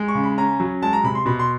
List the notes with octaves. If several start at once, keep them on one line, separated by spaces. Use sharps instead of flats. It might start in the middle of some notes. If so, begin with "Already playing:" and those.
Already playing: G#3
C#6
C#3
B5
C#4 A#5
F#3
G#3 A5
A#5
C3 B5
C6
B2 B5
C6